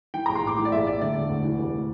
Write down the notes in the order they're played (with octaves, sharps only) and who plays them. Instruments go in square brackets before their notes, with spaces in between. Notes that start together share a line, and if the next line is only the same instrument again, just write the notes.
[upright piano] E3 G5
A#1 A#5
C6
A2 D6
E3
D5
A#1 E5
A2 D5
D3 D5
E1
D2
E3
F1